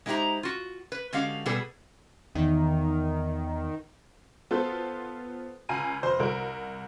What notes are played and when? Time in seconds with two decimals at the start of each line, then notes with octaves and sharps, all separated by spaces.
0.06 G#3 D#4 E4 G4 C5 A#5
0.43 F4 F#4
0.92 B4
1.13 D3 G#3 C#4 F#4 G4 F5
1.46 B2 G3 G#4 A4 B4
2.35 E2 D#3
4.51 B3 F4 A4 C5
5.69 C#2 F5 G#5 A#5 D#7
6.03 F1 C5
6.19 C2 A#4 D7